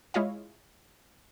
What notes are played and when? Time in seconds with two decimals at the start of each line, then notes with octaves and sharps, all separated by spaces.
0.14 G#3 E4 F4 C#5 D#5 F5